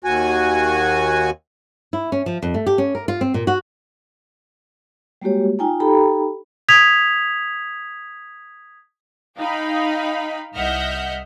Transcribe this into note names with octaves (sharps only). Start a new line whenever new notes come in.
D#2 F#4 G#5
E4
C#4
F3
F2
A3
G4
C#4
A#4
F4
C4
A#2
F#4
G3 G#3 A#3 F#4 G4 C#5
D#4 F4 G5 G#5 A#5
D#4 G4 A4 G5 A#5 B5
D#6 G#6 B6 F7
D#4 F5 G5 B5
C2 D#5 E5 F#5 F6 G6